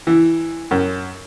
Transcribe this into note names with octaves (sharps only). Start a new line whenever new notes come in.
E3
F#2